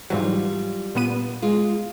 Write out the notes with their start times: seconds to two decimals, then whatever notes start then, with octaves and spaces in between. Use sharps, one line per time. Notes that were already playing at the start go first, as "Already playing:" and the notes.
0.10 G#2 E3 F#3 G3 F4
0.95 A#2 B3 D#7
1.42 G#3 F4